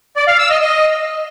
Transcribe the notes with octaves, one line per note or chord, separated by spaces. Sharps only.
D5
F5
E6
D#5
D#5